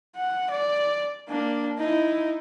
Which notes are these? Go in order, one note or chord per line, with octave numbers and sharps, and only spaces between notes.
F#5
D5
A#3 D4
D#4 E4